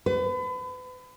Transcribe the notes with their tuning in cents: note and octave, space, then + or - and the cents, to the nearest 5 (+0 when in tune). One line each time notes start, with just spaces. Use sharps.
B4 +35